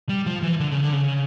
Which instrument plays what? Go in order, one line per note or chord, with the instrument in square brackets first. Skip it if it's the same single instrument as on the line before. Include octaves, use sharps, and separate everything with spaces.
[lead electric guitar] G3
F3
E3
D3
C#3
D3
C#3